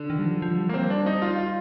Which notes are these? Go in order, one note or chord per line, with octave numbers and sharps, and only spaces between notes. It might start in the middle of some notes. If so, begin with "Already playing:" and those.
Already playing: D3
D#3
G3
F3
F3
G3
A#3
C4
D4
D#4
F4
F4